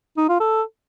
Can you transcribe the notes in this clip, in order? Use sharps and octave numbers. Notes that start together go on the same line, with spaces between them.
D#4
F4
A4